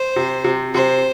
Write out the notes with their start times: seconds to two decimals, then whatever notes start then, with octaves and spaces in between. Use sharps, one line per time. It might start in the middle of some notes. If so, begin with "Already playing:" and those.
Already playing: C5
0.16 C3
0.44 C3
0.74 C3 C5